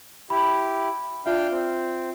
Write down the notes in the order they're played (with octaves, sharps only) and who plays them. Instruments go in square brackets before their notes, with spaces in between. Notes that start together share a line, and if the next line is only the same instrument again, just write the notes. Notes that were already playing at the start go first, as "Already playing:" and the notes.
[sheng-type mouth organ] E4 G4 [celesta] B5
[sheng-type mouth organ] D4 F5 G5 [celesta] F4 E5
[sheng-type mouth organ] C4